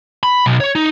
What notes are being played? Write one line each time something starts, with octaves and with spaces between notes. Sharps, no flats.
B5
B1
C#5
D#4